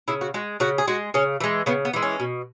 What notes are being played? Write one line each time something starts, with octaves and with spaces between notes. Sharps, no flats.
C#3 E4
F#4
G#3 F#4
C#3 F#4
G#4
G#3 F#4
C#3 C#4
E3 G#3
C#3 B3
B3
E3 G#3
C#4
B2